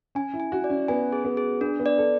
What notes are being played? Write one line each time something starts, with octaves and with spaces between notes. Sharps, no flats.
C#4 G#5
E4
G#5
F#4
D5
C#4
B3 G#5
G#4
B3
G#4
B3 D4
B3
D5
A4